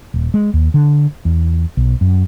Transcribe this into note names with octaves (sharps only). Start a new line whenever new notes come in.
D#1
G#3
D#2
D3
E2
B1
F#2